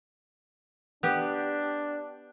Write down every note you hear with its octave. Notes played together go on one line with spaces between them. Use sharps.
B3 D4 G4